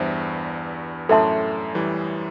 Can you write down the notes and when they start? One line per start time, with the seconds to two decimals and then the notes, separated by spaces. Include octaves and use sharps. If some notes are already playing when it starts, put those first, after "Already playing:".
Already playing: E2 G2 C5 E5
1.09 F#2 A2 A4 E5 A5 C6
1.75 E3 G3